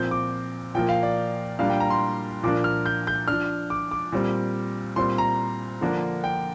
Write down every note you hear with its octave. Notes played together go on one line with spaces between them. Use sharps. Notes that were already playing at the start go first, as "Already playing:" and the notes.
Already playing: A#2 F3 C4 G6
D6
A#2 F3 A#3 G5
F5
D5
A#2 G3 A#3 D4 F5
G5
A#5
C6
A#2 F3 A#3 D4 D6
F6
G6
G6
F3 D4 F6
D6
D6
A#2 G3 C4
A#2 G3 C4 C6
A#5
D3 F3 A#3 D4
G5